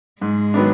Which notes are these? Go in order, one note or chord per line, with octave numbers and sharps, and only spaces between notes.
G#2 G#3
D#3 F#3 B3 D4